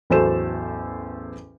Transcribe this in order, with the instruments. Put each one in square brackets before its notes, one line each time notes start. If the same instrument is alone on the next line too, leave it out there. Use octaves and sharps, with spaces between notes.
[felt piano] A1 E2 F#3 A4 C5 E7